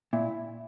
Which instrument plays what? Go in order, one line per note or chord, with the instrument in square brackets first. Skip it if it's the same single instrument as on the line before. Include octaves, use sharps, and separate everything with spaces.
[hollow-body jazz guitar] A#2 [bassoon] E4